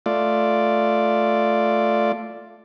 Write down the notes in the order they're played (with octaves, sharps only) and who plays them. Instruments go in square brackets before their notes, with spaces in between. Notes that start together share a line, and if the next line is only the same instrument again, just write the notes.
[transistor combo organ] A3 F4 D5